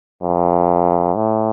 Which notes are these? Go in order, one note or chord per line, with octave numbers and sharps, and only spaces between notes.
F2
A2